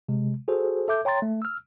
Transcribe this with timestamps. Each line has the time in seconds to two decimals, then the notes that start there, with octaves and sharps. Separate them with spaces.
0.09 C3 G#3
0.48 F#4 G#4 A4 C5
0.88 A4 E5 D6 G6
1.05 C#5 G5 A#5 C6 A6
1.22 A3
1.42 E6 F6